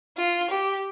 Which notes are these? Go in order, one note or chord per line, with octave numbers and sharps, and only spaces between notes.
F4
G4